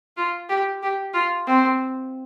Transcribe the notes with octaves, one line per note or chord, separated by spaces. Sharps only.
F4
G4
G4
F4
C4